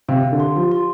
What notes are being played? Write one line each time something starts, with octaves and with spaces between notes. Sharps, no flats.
C3 F5
G4
D3
C6
F3 G4
C6